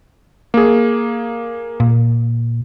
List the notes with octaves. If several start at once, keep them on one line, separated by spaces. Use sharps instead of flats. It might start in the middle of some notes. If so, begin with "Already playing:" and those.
A#3 G#4
A#2